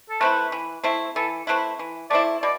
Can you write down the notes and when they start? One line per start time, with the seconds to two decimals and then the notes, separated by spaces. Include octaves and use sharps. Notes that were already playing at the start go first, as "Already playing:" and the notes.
0.10 A4
0.21 A3 C4 E4 B4
0.52 E3
0.83 A3 C4 E4
1.16 E3 A4
1.47 A3 C4 E4 B4
1.79 E3
2.10 A3 C4 E4 D5
2.42 B2 D5